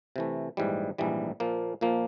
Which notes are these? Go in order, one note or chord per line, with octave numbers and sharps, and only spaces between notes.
C3 E3 A3
A#1 G#2 E3 G3
A#1 G#2 E3 G3
A#2 F3 A#3
A#2 F3 A#3